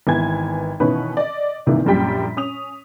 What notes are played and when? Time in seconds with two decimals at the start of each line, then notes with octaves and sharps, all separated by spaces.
0.07 G#1 E3 B3 G#5 G#6
0.80 B2 D#3 E3 C#4 B4
1.17 D5 D#5
1.66 C2 G#2 C3 D#3 E3 A#3
1.85 A#1 F#2 A#2 G3 G5 B6
2.37 C#4 D#6 F7